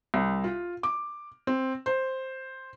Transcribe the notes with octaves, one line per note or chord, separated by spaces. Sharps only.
C2
F4
D6
C4
C5